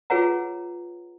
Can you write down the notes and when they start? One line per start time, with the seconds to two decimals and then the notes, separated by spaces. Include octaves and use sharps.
0.10 F4 G#4 B4 C#5 F#5 A#5